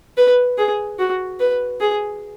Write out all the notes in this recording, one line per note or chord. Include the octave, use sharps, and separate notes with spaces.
B4
G#4
F#4
B4
G#4